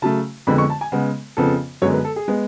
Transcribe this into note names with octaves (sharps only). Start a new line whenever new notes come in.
C#3 F#3 A3 A5
F2 D3 G#3 B3 B5
C#6
A5
G#5
C#3 G#3 B3 F#5
F2 C#3 F3 B3 A4
F#2 D3 G#3 B3 C#5
B4
A4
G#4
G#3 B3